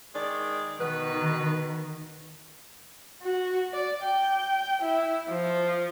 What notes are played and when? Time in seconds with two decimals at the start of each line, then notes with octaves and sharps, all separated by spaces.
0.15 D#3 G#3 D5
0.79 B2 D#3 B4
3.22 F#4
3.73 D5
4.02 G5
4.82 E4
5.28 F3